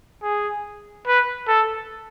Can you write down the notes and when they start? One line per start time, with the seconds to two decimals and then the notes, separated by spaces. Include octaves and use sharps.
0.23 G#4
1.07 B4
1.48 A4